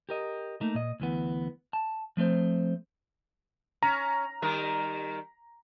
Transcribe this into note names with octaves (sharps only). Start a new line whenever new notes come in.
G4 A#4 D#5
A3 A#3 D#4 A#4
A#2 D#5
D2 E3 B3
A5
F3 A3 C4 C5
C#4 A#5
D#3 G3 A#4